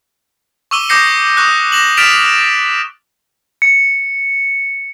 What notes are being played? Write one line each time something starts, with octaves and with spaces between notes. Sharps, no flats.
C#6 D6 E6 D#7 G7
D6 D#6 G6 A#6 C7 C#7
C#6 D#6 F#6
D6 A#6 E7 F#7
F6 A6 B6 D7 E7 F7
C#7